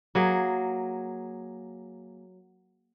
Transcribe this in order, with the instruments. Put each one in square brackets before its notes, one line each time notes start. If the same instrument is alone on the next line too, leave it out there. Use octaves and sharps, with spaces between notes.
[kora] F#3 A#3 G#4